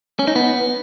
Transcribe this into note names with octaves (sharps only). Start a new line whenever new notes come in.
C#4
D#4
B3